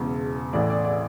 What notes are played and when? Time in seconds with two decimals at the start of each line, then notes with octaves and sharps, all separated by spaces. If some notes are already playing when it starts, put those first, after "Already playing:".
Already playing: E1 E2 C#3
0.53 A1 A2 E3 D5
0.70 D5
0.85 D5